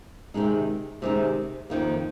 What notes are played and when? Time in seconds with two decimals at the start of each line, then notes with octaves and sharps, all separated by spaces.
0.34 C3 D#3 G#3 D#4
1.02 C3 D#3 G#3 D#4
1.70 F2 D#3 A#3